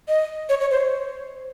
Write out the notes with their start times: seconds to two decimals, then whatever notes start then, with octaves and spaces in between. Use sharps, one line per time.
0.08 D#5
0.49 C#5
0.60 C#5
0.71 C5